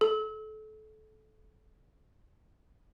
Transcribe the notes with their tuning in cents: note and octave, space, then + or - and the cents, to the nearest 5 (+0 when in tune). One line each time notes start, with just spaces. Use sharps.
A4 -25